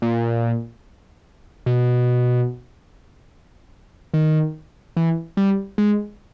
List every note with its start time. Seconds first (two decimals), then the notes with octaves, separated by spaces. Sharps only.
0.02 A#2
1.66 B2
4.14 D#3
4.97 E3
5.37 G3
5.78 G#3